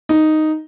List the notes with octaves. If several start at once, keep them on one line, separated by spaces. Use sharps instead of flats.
D#4